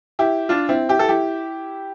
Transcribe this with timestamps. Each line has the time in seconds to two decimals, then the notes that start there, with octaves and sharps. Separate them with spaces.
0.19 E4 G4
0.49 D4 F4
0.69 C4 E4
0.89 E4 G4
0.99 A4
1.09 E4 G4